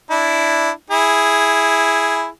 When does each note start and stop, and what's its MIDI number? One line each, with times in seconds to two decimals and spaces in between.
0.10 0.70 62
0.10 0.70 64
0.90 2.28 64
0.90 2.28 68